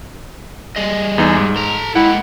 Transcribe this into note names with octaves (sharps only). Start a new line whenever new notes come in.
G3 G#4 D#5
E2 E3 D#4
G#2
A4 A#5
G#3 A#3 E4 F#5 G5